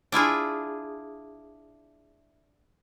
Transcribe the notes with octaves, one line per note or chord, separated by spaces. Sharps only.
D4 E4 F4 G#4